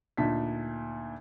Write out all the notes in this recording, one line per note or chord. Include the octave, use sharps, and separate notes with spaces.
D2 A#2 D4 D#4 A5 B6